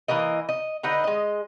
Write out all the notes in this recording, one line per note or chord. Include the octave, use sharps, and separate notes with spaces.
E3 A#3 A#4 D#5
D#5
D3 D#4 B4 D#5
G#3 D#5